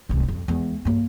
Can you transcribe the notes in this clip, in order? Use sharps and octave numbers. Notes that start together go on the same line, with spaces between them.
D1 C2
F2
E2 G#3
G2 A#3